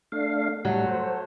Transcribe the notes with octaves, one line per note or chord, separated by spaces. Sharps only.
A3 D4 F5
A2 F#3 G3 A3
C5